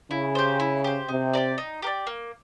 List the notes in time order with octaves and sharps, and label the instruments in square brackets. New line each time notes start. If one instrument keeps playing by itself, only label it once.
[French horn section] C#3 [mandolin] E4
[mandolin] G4 C5
E4
G4 C5
[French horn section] C3 [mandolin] D#4
[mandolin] G4 A#4 D5
D#4
G4 A#4
D5
A#3